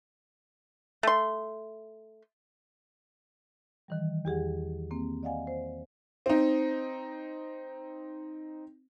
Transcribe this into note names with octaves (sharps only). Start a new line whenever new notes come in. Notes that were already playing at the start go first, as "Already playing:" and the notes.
A3 C6
D#3 E3 G3
E2 G4 G#4 F#5
A#3 C4
D5 D#5 F5 F#5 G#5
C5
C4 D#4